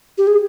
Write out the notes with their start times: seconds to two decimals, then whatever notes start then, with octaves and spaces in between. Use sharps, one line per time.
0.18 G4
0.27 G#4